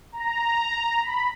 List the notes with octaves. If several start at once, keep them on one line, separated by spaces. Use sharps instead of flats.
A#5
B5